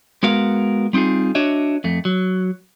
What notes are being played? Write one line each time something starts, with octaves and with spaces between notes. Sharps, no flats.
G#3 B3 F#4 A#4 F5
G3 C4 D#4 F4 G#4
D4 F#4 C#5 D#5 E5
F2 A3
F#3